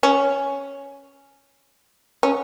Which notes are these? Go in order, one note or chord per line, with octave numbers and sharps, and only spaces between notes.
C#4
C#4